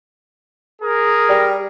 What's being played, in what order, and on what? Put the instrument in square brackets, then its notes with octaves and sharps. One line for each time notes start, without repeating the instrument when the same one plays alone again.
[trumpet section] G#4 A#4
[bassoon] G3